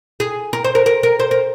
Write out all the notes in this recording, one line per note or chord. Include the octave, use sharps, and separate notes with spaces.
G#4
A#4
C5
A#4
A#4
A#4
C5
A#4